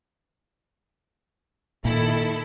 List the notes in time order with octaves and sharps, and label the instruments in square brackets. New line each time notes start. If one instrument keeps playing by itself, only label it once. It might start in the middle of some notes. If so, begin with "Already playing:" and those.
[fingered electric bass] A#2 [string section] D#3 E4 A4